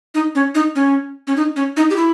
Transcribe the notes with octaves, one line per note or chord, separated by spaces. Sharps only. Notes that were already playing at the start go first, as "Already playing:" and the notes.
D#4
C#4
D#4
C#4
C#4
D#4
C#4
D#4
G4
E4